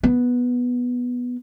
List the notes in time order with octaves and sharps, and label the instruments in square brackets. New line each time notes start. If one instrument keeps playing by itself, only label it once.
[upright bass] B3